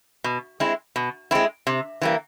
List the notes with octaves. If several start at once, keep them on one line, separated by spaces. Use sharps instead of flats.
B2
G#3 C4 E4
B2
G#3 C4 E4
C3
E3 G3 A#3